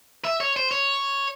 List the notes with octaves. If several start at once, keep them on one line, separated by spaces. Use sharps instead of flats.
E5
C#5
C5
C#5